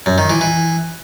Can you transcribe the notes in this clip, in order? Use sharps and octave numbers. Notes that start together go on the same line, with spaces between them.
F#2
D#3
E3
E3